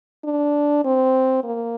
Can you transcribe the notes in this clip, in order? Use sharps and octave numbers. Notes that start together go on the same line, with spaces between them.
D4
C4
A#3